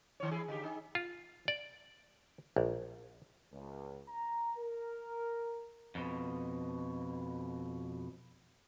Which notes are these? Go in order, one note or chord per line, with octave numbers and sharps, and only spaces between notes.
D#3 C#5
E3 E4 G#4
D3 D#4 G4
D#4 G#4
F4
D5
A#1
C#2
A#5
A#4
F2 B2